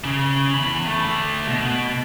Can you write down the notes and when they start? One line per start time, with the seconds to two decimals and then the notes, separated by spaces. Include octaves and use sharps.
0.04 C#3
0.54 E2 B5
0.87 D3 A3
1.48 B2